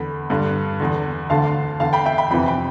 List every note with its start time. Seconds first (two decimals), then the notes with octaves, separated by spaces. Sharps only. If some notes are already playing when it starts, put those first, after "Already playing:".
Already playing: E2 D3 B5
0.30 G2 D3
0.80 E2 D3
1.30 D2 D3 F5 A5
1.80 E2 D3 F5 A5
1.93 G5 B5
2.05 E5 G5
2.18 G5 B5
2.31 F2 C3 E3 G5 B5
2.48 G5 B5